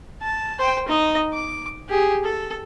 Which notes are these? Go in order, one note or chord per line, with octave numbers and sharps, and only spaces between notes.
A5
C5 G5
D#4 D#5
D6
G4 G#4
A4